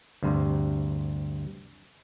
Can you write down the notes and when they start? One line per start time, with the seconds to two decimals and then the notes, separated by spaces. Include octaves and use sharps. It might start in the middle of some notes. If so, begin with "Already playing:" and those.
0.22 D2 G2 C3